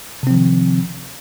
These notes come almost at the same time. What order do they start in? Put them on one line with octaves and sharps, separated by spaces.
C3 C4 F3 D#3